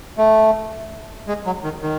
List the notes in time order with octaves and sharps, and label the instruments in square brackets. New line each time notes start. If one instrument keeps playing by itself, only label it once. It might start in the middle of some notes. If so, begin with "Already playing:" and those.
[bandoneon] A3
G#3
F#3
D#3
D#3